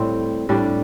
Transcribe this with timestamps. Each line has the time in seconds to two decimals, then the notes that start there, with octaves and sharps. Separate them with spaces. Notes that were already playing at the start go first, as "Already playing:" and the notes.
Already playing: A2 G3 C4
0.49 A2 G3 D4